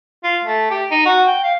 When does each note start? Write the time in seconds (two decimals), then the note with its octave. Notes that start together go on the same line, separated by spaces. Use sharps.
0.24 F4
0.44 A3
0.71 G4
0.91 D#4
1.06 F#4
1.27 G5
1.43 F5